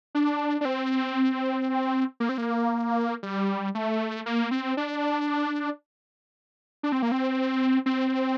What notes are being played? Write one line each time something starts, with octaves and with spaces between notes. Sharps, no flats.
D4
D4
C4
A#3
C4
A#3
G3
A3
A#3
C4
D4
D4
C4
A#3
C4
C4